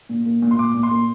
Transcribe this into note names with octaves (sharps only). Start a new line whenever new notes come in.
A#2
A#3
A#2
C6
A#2 D6
A#2
C6
A#3